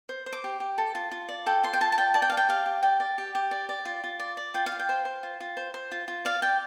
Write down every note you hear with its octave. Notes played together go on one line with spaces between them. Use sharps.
C5
C5
D6
G4
G4
A4
F4
F4
D5
A4 G5
F4 C6
G5
F4 A5
A5
D5 G5
D5 A5
G5
D5 F5
G5
G4 F5
G4
D5 G5
D5
G4
G4
D5
D5
F4
F4
D5
D5
F4 G5
F5
F4
G5
C5
C5
F4
F4
C5
C5
F4
F4
D5 F5
D5 G5